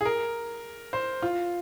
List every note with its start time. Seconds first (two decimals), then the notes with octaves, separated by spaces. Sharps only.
0.01 G#4
0.05 A#4
0.93 C5
1.22 F4